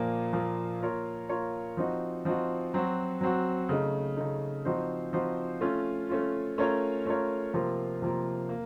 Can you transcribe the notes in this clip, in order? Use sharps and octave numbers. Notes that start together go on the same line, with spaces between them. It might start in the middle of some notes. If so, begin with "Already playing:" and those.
Already playing: A#2 F3 A#3
A#2 F3 A#3
A#3 F4 A#4 C#5
A#3 F4 A#4 C#5
F3 C4 D#4 F#4
F3 C4 D#4 F#4
F#3 C4 F#4
F#3 C4 F#4
C#3 A3 D#4
C#3 A3 D#4
F3 C4 D#4 F#4 C5
F3 C4 D#4 F#4 C5
A3 C#4 F4
A3 C#4 F4
A3 C#4 F4 A#4 C#5
A3 C#4 F4 A#4 C#5
C3 F3 A#3 F4 A#4
C3 F3 A#3 F4 A#4
A#3